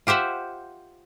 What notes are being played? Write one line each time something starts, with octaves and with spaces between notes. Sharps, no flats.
F4 G4 C5 E5 F#5